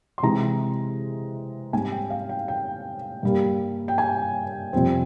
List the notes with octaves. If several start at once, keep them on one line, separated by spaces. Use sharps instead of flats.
C6
C3 E3 G#3 C4 A#5
G#2 G3 C4 G#5
G5
F5
G5
G5
G2 G3 A#3
G5
G#5
F2 C3 G3 C4